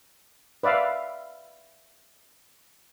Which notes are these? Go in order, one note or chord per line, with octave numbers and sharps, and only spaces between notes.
B4 D5 E5 F5